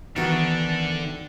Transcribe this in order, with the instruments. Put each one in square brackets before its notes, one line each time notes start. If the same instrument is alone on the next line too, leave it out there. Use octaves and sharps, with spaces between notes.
[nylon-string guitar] D#3 B3 F#4 [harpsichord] E3 A#4 [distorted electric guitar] D4 A4